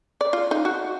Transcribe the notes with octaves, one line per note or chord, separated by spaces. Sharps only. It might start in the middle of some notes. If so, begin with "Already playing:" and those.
D5
F4
D#4
F#4